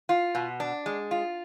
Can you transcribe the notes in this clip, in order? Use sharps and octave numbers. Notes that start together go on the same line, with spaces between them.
F4
B2
D4
G#3
F4